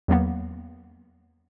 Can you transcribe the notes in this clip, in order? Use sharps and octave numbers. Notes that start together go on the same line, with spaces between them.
E2 F#3 A#3 B3